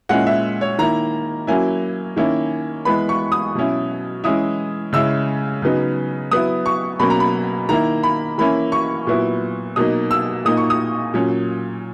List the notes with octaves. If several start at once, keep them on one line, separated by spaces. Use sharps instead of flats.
A#2 G#3 C#4 E4 F#5
E5
C#5
D#3 A#3 E4 A#5
F#3 A#3 C#4 E4 G#5
D#3 A#3 C#4 E4
E3 G#3 B3 B5
C#6
D#6
B2 F#3 C#4 E4
E3 G#3 C#4 E4 D#6
C#3 G#3 C#4 E4 E6
C#3 F#3 B3 D#4
F#3 B3 E4 D#6
C#6
B2 F#3 A#3 C#4 B5
A#5
B5
D#3 A#3 E4 A#5
B5
E3 A#3 C#4 E4 B5
C#6
A#2 F#3 B3 E4
B2 F#3 A#3 D#4 D#6
E6
A#2 A#3 D#4 D#6
C#6
D#6
A#2 F#3 C#4